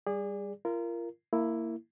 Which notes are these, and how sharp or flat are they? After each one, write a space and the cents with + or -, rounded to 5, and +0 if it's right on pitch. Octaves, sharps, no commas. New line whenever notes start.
G3 +15 G#4 -30 D5 +0
F4 -35 A#4 +0
A#3 -15 E4 +0